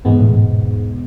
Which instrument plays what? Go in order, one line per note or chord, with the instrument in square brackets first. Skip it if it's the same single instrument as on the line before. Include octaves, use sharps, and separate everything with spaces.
[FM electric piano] E2 B2 G#3 B3 [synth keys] G#2
[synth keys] A2
G#2